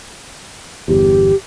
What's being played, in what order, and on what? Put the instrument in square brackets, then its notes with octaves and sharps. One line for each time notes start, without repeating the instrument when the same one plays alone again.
[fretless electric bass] G1 E2 [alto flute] G4